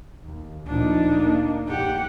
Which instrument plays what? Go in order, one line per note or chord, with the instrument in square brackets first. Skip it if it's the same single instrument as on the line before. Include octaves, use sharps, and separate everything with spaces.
[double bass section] D#2
[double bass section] D2 A#2 F3 [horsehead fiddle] D4 D#4
[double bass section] A#3
[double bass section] A#1 F2 [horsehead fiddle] G4 F#5